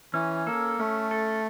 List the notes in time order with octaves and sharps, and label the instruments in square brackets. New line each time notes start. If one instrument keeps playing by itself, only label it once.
[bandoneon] E3 [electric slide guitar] C#4
[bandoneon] A#3 [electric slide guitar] A4
[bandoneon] A3 [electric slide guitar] C#4
[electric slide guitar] A4